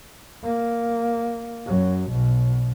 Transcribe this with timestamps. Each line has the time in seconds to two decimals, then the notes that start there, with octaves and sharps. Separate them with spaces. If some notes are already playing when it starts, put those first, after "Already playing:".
0.43 A#3
1.66 F#2 F#3
2.11 B1 B2